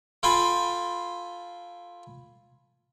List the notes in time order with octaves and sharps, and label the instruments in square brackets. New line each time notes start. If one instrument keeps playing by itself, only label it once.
[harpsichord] F4 A4 G5 G#5 B5 C6